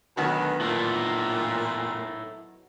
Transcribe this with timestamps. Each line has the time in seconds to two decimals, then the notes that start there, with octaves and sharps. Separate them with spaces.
0.17 D2 B2 D#3 F#3 B3
0.61 A#2 E4 A4 A#4